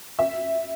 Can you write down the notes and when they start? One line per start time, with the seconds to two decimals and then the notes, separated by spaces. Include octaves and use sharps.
0.19 E5